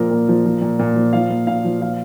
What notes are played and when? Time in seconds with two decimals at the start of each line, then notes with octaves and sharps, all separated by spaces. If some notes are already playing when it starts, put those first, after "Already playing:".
Already playing: A#2 F3 A#4
0.11 A#2
0.28 F3
0.46 F3
0.61 A#2
0.79 A#2
0.96 F3
1.13 F3 F5
1.30 A#2
1.47 A#2 F5
1.64 F3
1.81 F3 F5